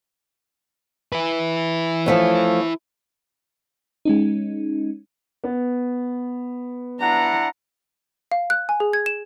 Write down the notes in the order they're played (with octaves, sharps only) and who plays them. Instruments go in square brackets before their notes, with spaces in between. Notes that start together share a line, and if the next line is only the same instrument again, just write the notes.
[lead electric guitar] E4 B4
[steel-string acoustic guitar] F3 A3 C#4
[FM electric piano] G#3 C#4 D#4
[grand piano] B3
[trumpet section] D4 E4 F#5 [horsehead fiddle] A#5
[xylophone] F5
F#6
G#5
G#4
G#6
E7